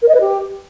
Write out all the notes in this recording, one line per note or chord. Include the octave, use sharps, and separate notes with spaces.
A#4
D#5
B4
G4